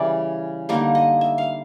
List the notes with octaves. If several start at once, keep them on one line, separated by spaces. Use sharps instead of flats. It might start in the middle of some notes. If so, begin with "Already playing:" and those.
Already playing: C#3 E3 G3 D5
D3 G3 A#3 D#4
D#5
E5
F5